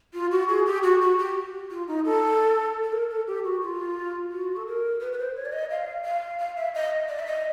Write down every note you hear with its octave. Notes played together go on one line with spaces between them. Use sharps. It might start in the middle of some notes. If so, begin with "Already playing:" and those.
F4
F#4
G#4
G4
F#4
F#4
G4
F4
D#4
A4
A4
A#4
A4
G4
F#4
F4
F#4
A4
A#4
B4
B4
C5
C#5
D5
D#5
F5
F5
F5
E5
D#5
D5
E5
D#5